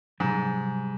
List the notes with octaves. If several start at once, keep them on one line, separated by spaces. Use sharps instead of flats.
G#2 C3 F#3 G3 G#4